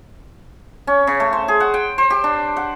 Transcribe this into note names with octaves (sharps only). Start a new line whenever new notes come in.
C#4
C#3
A3
C5
G#4
F#5
G5
C5
G4
D4
F#5